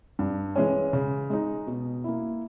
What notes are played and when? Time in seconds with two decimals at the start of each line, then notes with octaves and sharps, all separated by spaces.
0.19 G2
0.56 E3 G#3 C#4
0.93 C#3
1.30 G#3 D#4
1.67 B2
2.04 A#3 E4